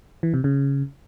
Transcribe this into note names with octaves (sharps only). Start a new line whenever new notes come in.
E3
C3
C#3